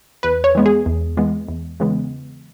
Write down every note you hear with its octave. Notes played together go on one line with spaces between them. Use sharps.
E2 B4
C#5
E3 G#3 B3
G#4
E2
E3 G#3 B3
E2
C#3 E3 G#3 B3